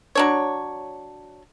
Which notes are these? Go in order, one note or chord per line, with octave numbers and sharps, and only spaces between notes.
F#3 D4 C#5